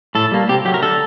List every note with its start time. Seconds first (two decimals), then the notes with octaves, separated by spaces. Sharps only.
0.15 A2 A4
0.32 G3 A#3
0.49 C3 G4
0.65 F#3 A3 G4
0.74 A#4
0.82 D3 A4